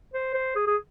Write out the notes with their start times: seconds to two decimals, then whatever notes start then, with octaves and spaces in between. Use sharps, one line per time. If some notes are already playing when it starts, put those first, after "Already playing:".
0.14 C5
0.34 C5
0.56 G#4
0.67 G#4